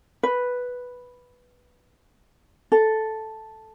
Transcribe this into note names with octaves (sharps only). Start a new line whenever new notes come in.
B4
A4